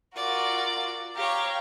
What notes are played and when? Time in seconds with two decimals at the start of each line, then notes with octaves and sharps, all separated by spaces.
0.16 F4 F#4 A#4 D5
1.15 G4 C#5 F5 G5 A#5